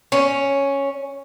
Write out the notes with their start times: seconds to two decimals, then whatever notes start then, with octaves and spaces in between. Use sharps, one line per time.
0.12 C#4